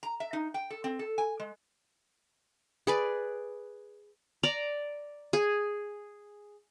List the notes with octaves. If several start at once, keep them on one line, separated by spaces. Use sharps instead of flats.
A#5
E5
D#4
G5
A4
C4
A4
G#5
G#3
G#4 B4 D5
D5 A#5
G#4